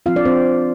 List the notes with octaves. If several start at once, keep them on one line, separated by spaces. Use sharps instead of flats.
F3 C4 F4 F5
D4 D5
C4 C5